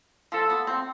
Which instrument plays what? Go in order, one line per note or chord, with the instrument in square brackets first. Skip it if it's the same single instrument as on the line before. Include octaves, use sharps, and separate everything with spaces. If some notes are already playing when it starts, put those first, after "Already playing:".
[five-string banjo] F3 [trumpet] A4
[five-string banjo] B3
C4